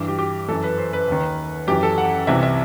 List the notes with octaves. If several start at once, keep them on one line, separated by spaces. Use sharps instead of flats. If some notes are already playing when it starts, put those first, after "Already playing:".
Already playing: G2 E3
G4
G4
F#2 E3 A4
B4
C5
B4
D#2 D#3
F#2 E3 G4
A4
F#5
C2 C3 E3 E5
E5